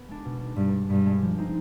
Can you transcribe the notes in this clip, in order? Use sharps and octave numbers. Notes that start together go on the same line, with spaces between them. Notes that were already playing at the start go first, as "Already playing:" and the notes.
Already playing: B3
G#3 D4
B2
D4
G#3
G2 B2
G#3 D4
G2 B2
G#3 D4
F3
C4 D#4